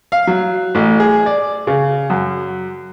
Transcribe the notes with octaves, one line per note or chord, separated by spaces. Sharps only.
F5
F#3
A1
G#4
D5
C#3
F#2